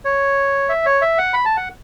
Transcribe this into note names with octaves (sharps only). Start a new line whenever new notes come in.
C#5
E5
C#5
E5
F#5
B5
A5
F#5